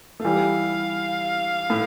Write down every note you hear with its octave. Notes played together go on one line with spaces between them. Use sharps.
A3
E3 G3 F5
A2